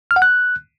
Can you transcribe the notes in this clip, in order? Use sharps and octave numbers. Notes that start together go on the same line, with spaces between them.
F6
F#5
F#6